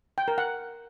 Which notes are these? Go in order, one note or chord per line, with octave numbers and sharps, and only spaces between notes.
G5
A#4
F#5